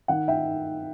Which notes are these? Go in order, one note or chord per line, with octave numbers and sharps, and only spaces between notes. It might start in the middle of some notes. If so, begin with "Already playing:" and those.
D#3 F#5
E5 G5